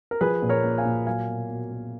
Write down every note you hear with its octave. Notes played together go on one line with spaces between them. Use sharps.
A#4
F3 G#4 B4
A#2
A#4 C#5
A#3
F5 G#5
A#2
F#3 F5 G#5
B2
B2
A#3